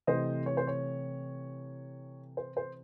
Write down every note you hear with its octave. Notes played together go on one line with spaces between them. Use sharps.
C3 E3 A3 C5 D#5
C#5
C5
C#5
C5
C5